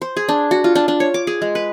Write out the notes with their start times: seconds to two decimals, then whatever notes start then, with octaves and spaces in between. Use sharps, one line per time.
0.02 C5
0.17 G#4
0.29 D4
0.51 F#4
0.64 F4
0.75 D4
0.88 D4
1.00 C#5
1.14 D6
1.27 G#4
1.42 G#3
1.55 B4